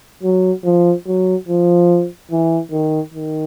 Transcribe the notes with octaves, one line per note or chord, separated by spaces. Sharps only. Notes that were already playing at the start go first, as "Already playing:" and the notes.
F#3
F3
F#3
F3
E3
D#3
D#3